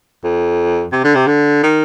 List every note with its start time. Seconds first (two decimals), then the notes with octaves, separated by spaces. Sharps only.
0.24 F2
0.92 C3
1.04 D3
1.15 C3
1.27 D3
1.63 D#3